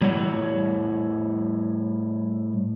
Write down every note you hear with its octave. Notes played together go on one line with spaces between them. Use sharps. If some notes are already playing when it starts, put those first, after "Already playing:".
A2 G3 E4 C#5 F5 F#5